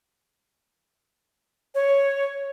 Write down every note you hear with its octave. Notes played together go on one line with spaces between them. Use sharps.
C#5